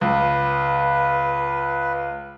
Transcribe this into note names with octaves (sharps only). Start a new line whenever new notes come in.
C#2 B4